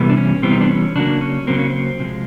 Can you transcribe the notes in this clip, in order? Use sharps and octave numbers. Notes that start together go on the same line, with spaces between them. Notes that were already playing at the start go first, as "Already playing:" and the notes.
Already playing: C3 E3 G3 B3
D4
C#4
C3 E3 G3 B3 C4
D#4
D4
C#4
C#3 F#3 A#3 D4
C#4
C#3 F#3 A#3 C4
C#4
C4
C3 F3 G#3